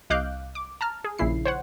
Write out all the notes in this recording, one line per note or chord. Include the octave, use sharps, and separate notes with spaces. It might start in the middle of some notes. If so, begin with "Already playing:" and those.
C2 D#5 F5 D6 F#6 G6
D6
A5 A#5 F6
G#4
A#1 A#2 C#3 E4 C7
C5 C#5 F#5